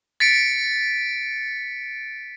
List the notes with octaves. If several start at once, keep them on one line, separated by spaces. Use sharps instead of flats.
A6 B6 C#7 D7